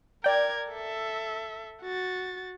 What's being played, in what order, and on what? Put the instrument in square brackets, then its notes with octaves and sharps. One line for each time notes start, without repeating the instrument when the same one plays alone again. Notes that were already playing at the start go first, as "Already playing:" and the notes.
[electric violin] A#4 G#6 [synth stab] D5 G5
[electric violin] A4 E5
F#4 A6